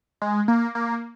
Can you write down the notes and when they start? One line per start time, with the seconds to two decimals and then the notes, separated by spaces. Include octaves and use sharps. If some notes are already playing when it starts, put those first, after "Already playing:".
0.22 G#3
0.48 A#3
0.75 A#3